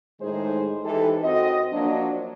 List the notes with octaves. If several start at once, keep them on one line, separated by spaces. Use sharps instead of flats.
A2 D#3 G#3 D#4 G#4 C5
E3 G#3 D#4 G4 A4
F#2 C4 F#4 C5 D#5
F3 F#3 A#3 D4